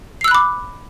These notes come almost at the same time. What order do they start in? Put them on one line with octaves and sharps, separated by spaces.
C7 E6 F#6 B5 D6